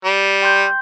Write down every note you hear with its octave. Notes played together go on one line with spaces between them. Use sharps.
G3
G5 C6 G6